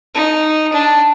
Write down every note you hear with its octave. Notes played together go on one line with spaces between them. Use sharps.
D#4
D4